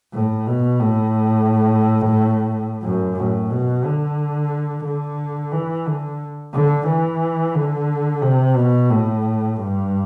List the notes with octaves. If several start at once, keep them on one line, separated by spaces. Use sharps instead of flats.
A2
B2
A2
F#2
A2
B2
D3
D3
E3
D3
D3
E3
D3
C3
B2
A2
G2